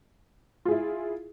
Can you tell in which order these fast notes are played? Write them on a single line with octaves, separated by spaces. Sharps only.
F4 G#4 E4